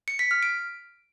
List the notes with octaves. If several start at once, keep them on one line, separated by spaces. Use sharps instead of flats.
C#7
B6
F6
D7